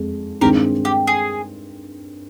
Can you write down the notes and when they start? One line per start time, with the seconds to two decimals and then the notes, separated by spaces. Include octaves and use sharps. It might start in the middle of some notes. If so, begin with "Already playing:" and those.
Already playing: F2 G#3
0.41 G2 D#3 G#3 C4 G4 A#4
0.85 G4
1.07 G#4